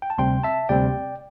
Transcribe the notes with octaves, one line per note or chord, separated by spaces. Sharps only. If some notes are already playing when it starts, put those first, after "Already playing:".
G5
A5
D2 C3 G3 C4 G5 C6
E5 A5
D2 C3 G3 C4 D5 G5